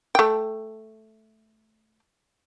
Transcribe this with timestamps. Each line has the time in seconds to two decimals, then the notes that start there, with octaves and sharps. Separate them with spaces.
0.15 A3 G5